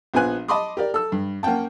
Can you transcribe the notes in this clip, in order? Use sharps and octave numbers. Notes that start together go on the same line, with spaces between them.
A#1 F3 B3 G#5 F#6
D#5 A5 B5 C6 D6 D#6
G4 A#4 D5
A4 E6
G2
A#3 C#4 F#5 G5 A5